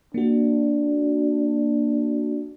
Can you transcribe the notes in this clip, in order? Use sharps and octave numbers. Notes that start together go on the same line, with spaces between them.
A#3 D4 F#4